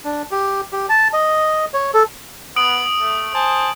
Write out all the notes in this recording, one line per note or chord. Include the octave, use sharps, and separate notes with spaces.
D4
G4
G4
A5
D#5
C#5
A4
B3 D#6 D7 F#7
A3
C5 G#5 A5